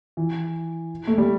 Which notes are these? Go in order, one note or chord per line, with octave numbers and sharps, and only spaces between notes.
E3
A3
G3